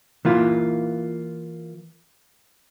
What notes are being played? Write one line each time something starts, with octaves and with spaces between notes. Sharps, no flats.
E3 A#3 F4